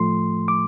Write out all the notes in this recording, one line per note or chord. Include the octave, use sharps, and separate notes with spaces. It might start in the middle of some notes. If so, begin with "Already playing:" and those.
Already playing: A2 F3 A3 C6
D6